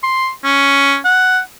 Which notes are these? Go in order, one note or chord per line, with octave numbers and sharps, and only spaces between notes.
C6
C#4
F#5